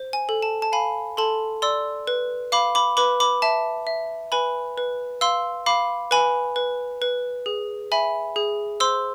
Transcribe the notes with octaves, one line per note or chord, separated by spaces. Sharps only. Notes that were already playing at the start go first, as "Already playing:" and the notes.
Already playing: C5
G#5
A4
A5
A5
F5 G#5 B5
A4 A5 C6
D5 C6 E6
B4
F5 B5 D6
B5 D6
B4 B5 D6
B5 D6
E5 A5
E5
B4 G#5 B5
B4
F5 C6 E6
F5 B5 D6
B4 G#5 B5
B4
B4
G#4
E5 G#5 B5
G#4
C5 C6 E6